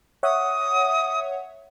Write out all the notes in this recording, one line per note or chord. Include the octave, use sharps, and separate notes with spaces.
C#5 E5 F#5 D#6